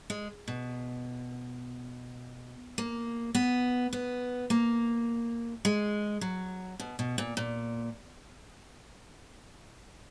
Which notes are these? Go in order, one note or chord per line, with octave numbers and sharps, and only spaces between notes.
G#3
B2
A#3
B3
B3
A#3
G#3
F#3
B2
B2
A#2
A#2